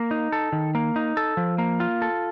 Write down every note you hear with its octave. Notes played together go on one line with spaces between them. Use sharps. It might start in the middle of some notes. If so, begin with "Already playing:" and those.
Already playing: A#3
D#4
A4
D#3
A#3
D#4
A4
F3
A#3
F4
A4